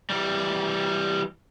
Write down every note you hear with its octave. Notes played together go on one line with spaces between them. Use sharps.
E3 G3